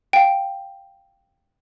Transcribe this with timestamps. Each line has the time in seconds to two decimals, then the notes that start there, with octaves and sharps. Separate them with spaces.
0.13 F5 G5